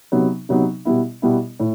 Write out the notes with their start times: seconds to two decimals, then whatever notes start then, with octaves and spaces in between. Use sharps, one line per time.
0.12 C3 F#3 B3 D#4
0.49 C3 F#3 B3 D#4
0.85 B2 G3 B3 E4
1.22 B2 G3 B3 E4
1.60 A2